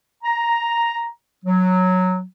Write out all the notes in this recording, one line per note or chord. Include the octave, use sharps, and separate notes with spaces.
A#5
F#3